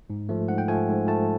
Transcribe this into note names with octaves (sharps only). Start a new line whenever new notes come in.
G#2
F3 A3
G#2 F#5
G5
F3 A3 G#5
G#2
F3 A3 A5